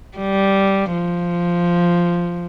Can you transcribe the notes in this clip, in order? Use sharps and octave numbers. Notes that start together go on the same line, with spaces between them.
G3
F3